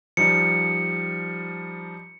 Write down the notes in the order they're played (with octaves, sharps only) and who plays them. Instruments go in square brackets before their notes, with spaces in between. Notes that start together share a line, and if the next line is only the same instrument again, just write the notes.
[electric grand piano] F3 G3 D#4 [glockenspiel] C#7